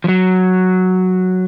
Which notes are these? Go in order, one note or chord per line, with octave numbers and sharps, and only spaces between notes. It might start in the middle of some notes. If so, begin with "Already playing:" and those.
F3
F#3